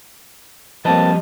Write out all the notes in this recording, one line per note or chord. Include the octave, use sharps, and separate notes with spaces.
F3 G3 A#3 C4 B4 D#5 A5